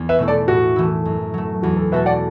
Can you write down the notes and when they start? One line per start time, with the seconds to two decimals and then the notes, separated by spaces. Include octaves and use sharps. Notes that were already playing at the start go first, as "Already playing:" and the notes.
Already playing: E2 B3
0.09 B4 E5
0.19 B2 A3 E4
0.28 A4 D5
0.48 A2 F#4
0.76 E3 A3 E4
1.05 F#2
1.34 F#3 A3
1.63 E2 F#4
1.77 A4
1.92 B2 A3 F#4 A4 B4 E5
2.06 D5 F#5